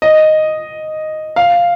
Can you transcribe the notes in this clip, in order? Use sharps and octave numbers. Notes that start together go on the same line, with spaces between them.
D#5
F5